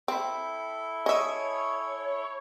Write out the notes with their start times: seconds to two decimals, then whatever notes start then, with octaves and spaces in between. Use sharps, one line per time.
0.08 C4 E4 A4 G5 B5
1.06 C#5 D#5 E5 G#5 C#6 D#6